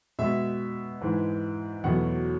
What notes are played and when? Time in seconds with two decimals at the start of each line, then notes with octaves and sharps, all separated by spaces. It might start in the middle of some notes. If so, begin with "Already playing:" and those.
0.19 B2 G#3 E5
1.01 G#2 E3 G#3
1.84 E2 B2 F#3 A3 F#5